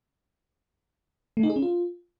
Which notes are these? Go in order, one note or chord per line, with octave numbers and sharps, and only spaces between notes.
A3
D#4
G#4
C#4
F4